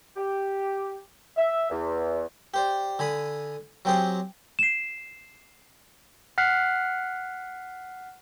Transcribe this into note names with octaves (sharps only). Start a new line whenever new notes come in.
G4
E5
E2
G4 C5 D5
D3 G#5 B5 D#6
F#3 C4 G4 G#4 C5
C7 E7
F#5 F6 F#6 B6 C7